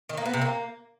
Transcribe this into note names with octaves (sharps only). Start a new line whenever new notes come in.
D#3
A#3
B3
C3
A#3